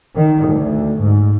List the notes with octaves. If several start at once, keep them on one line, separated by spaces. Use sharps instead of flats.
D#3
D2
G#2